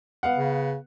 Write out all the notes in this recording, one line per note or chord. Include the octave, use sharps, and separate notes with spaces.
B3 F5 F#5
C#3